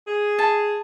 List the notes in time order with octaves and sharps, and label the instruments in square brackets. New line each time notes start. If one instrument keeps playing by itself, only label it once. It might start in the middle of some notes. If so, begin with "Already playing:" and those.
[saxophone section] G#4
[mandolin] A5